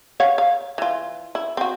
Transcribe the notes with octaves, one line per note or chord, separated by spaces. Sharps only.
C#5 F5 F#5
F5
E3 F4
E4
C4 F#4